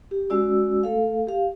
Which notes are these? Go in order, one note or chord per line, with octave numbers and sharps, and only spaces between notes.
G4
G#3 C#4 F#4 D5 E6
A3 A4 F5
G4 F5